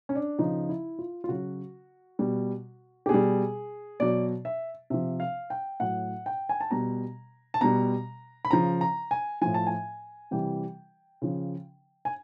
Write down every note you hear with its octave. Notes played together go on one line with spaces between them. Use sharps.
C#4
D4
C#3 F3 D#4
E4
F4
F4
C#3 F#3 F#4
B2 G3
G4
B2 G3 G#4
B2 F#3 D5
E5
C3 F3 E5
F5
G5
A2 F#3 F#5
G5
G#5
A5
B2 G3 A#5
A5
B2 G3 A#5
B5
C#3 F3 A#5
A#5
G#5
A2 F3 G#5
A5
G#5
C3 E3 G3 G5
C#3 F3
G#5